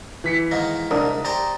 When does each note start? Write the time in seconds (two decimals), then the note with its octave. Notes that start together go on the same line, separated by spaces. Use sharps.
0.24 E3 B6 C#7
0.51 G#2 D#3 A#3
0.91 C2 G#2 D4 A#4 D#6
1.25 D4 G4 C5 A#5